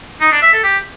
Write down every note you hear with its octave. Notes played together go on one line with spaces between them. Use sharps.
D#4
D4
E5
A4
G4